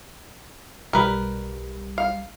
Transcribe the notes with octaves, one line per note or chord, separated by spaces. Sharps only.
B1 G3 A#4 B4
F5